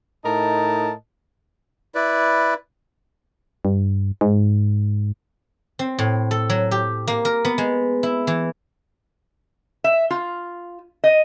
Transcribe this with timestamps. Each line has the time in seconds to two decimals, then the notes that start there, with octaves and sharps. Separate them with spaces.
0.24 A2 D#4 A#4 D#5 A5
1.95 E4 B4 D5
3.65 G2
4.21 G#2
5.79 C4
5.99 A2
6.31 A4
6.50 F#3
6.71 G4
7.07 A#3
7.25 A#4
7.45 B3
7.58 G#3
8.03 E4
8.27 E3
9.84 E5
10.10 F4
11.04 D#5